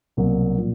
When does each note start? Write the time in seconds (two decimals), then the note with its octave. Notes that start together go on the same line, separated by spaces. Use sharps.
0.17 C2 B2 F#3 A#3
0.58 A#2 F3